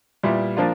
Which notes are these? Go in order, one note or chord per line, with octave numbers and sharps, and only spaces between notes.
A#2 G3 B3 E4
F3 A#3 D4 F4